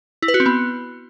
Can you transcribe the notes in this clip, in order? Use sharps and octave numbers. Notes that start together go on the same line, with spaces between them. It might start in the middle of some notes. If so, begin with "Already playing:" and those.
E4
B4
F#4
C4
B3